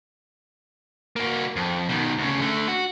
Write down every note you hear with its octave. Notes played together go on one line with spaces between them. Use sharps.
A#3 F#4
F2
B2 D#3
D2 C#3
D3 A3
F#4